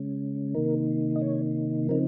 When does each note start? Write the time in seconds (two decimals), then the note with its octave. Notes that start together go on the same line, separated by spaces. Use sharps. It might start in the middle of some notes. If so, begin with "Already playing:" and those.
Already playing: C#3 G#3 C#4
0.54 C3 D#3 A#3 D#4 A#4
1.16 D#5
1.21 C#5
1.89 C#3 F3 C4 D#4 A#4